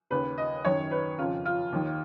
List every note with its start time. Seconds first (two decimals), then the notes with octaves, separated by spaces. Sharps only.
0.10 D#2 C#3 B4
0.38 D#5
0.65 F#2 D#3 C#5
0.91 B4
1.18 F2 C#3 F4
1.45 F4
1.72 D#2 D#3